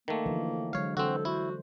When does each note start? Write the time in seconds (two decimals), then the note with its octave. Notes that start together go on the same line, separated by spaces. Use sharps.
0.08 D#3 A3 A#3
0.26 D3 E3 F3
0.73 D3 F#3 G#3 C#5 F5
0.97 D3 C4 F#4 A4 C5
1.25 E4 F#4 C5